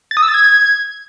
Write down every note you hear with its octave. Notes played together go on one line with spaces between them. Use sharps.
A6
D#6
E6
A6
G#6